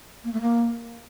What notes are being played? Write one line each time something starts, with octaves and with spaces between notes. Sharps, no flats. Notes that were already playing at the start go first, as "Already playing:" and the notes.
A#3
A3
A#3